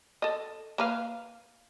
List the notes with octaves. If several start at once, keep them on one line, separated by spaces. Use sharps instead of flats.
A4 D#5
A#3 B4 F5